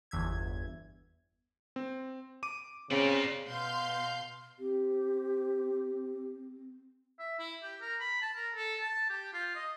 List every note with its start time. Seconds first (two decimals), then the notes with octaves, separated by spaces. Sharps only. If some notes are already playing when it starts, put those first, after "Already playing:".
0.11 G1 E2 E5 G#6
1.76 C4
2.43 D6 D#7
2.91 C#3 C4 F4 D5
3.47 B2 F5 C6 G6
4.59 C4 G4
7.19 E5
7.39 E4
7.62 G4
7.81 A#4
8.00 B5
8.22 A5
8.35 A#4
8.55 A4
8.80 A5
9.09 G4
9.33 F4
9.55 D#5